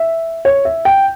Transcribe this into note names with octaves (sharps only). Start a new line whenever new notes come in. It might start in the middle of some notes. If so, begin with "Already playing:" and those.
Already playing: E5
C#5
E5
G5